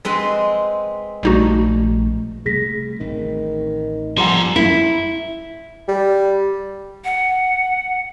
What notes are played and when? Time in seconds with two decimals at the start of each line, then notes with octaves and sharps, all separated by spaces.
0.05 G#3 C4 B4
1.23 A#1 G3 A3 D#4 F#4
2.46 C3 G3 A3 G#4 A#6 B6
3.00 A1 A2 D#3 C4
4.18 F3 G3 A4 F#5 A#5 C6
4.56 E4
5.88 G3
7.05 F#5